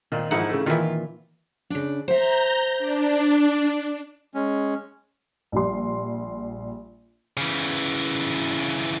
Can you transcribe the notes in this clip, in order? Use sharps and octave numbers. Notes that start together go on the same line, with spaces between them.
A#2 D#3 C4
G#2 E3 F3 D#4 E4 F#5
C#3 A3
A#2 D#3 E3 F4 E5
C#3 D4
C5 E5 A#5 G6
D4
G#3 C#4
A#1 G3 C6
C#3 E3